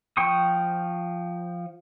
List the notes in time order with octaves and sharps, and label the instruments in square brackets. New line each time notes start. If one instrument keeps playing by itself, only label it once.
[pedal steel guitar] F3 G5 C#6 D#6